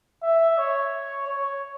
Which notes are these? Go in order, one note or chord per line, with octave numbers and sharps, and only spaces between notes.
E5
C#5
C#5